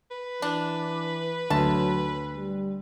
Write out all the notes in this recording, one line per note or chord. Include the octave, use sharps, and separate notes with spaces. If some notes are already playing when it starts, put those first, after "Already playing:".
B4
E3 D4
D2 F#3 A5
G3